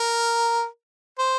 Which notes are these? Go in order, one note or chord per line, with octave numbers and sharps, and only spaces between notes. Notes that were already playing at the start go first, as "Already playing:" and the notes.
Already playing: A#4
C5